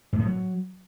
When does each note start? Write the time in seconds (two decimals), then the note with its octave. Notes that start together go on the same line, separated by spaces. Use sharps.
0.13 G#2
0.19 A2
0.26 F#3